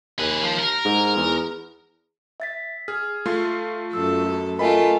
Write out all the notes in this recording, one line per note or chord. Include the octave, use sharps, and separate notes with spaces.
D#2 G#4 B4
F3
A#4
G#2
E2
E5 A6 B6
G#4 F6
A3 F4 C6
F#2 A4 E6
A3 F#4
A3 F4 A4 A#4 D#5 G#5 B5